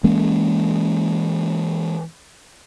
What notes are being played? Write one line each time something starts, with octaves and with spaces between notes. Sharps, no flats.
E3 G#3 A#3 C#4